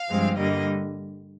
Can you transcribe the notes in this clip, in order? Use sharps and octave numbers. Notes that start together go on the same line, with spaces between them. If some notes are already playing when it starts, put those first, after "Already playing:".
Already playing: F5
G2 F3 G#3 C4
G2 D3 G3 A#3 D#5